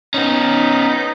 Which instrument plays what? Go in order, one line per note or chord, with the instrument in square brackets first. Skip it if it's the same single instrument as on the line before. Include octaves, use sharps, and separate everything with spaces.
[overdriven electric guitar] B3 C#4 [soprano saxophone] D#4